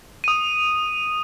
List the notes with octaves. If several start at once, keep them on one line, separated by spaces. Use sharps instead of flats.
D#6 D#7